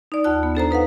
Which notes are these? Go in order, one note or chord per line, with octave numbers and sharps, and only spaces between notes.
D#4 D5
D#2 F4 A5 F#6
B3
D4 A4 C5 A#5
D#4 B4 F5 F#5